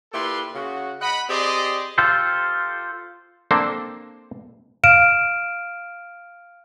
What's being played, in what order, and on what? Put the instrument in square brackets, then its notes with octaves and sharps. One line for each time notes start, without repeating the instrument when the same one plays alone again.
[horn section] A#2 E4 G4 A4 B4 C6
C#3 F#4
D#5 F#5 B5
C4 G4 G#4 D5 D#5 C6
[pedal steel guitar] F4 G4 A4 C5
[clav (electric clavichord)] A#3 C4 D4 A4 C5
[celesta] F5 F6 D7 E7